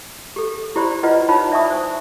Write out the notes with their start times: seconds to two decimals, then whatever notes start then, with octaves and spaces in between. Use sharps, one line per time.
0.36 G4 A4
0.76 E4 G4 C5 D5 B5 C6
1.03 E4 F4 B4 D5 D#5 F#5
1.28 D#4 F4 C#5 A5 B5
1.52 D5 E5 G#5 A5 C#6 D#6
1.70 C5 G#5